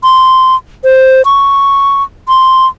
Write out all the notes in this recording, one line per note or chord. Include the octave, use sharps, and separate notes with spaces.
C6
C5
C#6
C6